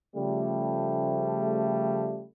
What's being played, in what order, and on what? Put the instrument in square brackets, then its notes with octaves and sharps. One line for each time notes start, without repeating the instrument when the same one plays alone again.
[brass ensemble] C#3 F3 G3 A3